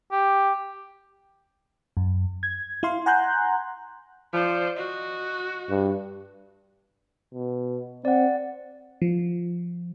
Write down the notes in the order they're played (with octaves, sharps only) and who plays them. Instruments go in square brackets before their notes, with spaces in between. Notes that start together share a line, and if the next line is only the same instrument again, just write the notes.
[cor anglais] G4
[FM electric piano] F#2
G#6
E4 F5 C6
F#5 G#5 A#5 C6 F#6 G6
[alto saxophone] F3 [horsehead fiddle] C5 D5
[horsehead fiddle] F#4 [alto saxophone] D#5
[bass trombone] G2
[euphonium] B2
[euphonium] C4 [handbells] D5 F#5
[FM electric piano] F3